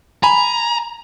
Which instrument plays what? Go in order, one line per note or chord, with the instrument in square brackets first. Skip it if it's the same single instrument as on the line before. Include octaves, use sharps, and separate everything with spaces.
[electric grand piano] G#5 B5 [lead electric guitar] A#5